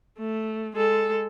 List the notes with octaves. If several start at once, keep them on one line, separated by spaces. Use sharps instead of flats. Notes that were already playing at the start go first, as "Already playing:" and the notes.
A3
G#3 A4